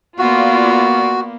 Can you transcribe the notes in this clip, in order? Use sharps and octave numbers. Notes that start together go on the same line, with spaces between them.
A#3 B3 F4 F#4 D5